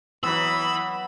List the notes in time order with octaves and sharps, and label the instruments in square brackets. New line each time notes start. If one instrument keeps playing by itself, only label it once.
[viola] E3 [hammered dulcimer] F#3 B3 [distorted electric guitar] B5 [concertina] E6